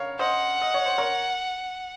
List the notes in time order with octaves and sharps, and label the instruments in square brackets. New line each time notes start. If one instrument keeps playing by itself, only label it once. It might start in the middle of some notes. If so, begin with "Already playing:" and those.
Already playing: [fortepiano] A#4 C#5 F5
[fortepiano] C5 D#5 [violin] F#5
[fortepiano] D#5
C#5
C5
A#4 C#5